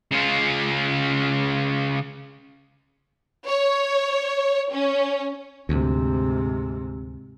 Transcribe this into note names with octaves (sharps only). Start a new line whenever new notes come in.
C#3 F4
C#5
C#4
D2 G#2 C3